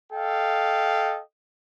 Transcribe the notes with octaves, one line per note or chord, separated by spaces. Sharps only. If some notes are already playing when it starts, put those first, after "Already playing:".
A4 D#5 F5 G5